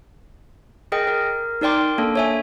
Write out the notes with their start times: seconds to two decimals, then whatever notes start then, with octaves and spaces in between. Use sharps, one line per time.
0.92 G#4 A#4 D#5 G5
1.07 A#4
1.61 D#4 A#4 D5 G5 C6 D6
1.98 A#3 D4 A4
2.16 C#5 E5 G#5